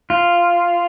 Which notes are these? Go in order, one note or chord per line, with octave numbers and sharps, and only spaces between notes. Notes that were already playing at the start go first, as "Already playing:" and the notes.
F4